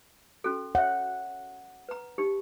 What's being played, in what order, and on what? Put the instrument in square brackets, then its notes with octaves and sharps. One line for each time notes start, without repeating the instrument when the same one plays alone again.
[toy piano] C#4 F#4 A4
[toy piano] C#5 E5 [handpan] F#5
[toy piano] B4 A#5
D#4 G4